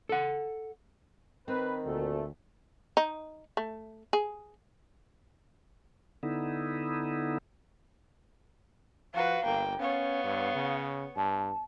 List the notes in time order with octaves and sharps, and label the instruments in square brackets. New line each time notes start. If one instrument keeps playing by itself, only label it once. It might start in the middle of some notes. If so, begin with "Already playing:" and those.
[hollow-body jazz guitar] A4 F#5
[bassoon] D#3 [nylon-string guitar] C4 [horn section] B4
[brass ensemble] D2 [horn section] A#2 A3
[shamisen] D#4
A3
G#4
[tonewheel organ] D3 B3 D#4 E4
[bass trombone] F3 [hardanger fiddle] F#4 B4 [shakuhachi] F5
[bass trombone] G1 [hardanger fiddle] A#3 G5
[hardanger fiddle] B3 C#5 [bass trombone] C#4 [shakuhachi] F5
[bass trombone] G2
C#3
[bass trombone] G2 [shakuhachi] A5